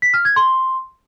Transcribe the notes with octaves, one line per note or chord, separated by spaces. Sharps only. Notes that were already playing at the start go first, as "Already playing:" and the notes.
B6
F6
G#6
C6